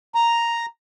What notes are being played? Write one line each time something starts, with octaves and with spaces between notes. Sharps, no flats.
A#5